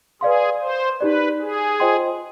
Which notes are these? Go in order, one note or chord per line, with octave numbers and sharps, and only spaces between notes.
G#4 B4 D5 F5 C6
C5
D#4 G4 B4 D5
G#4
F4 C5 D#5 G5 C6